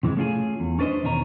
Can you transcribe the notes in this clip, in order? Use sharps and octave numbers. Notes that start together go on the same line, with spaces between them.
C3 E3 F#3 G#3
A3 C#4 F4 G4 G#4
E2
C#4 D4 B4 C5 D#5
E2 B2 D#3 C#5 D#5 A#5